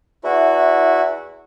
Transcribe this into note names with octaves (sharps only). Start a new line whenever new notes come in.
E2 E4 F#4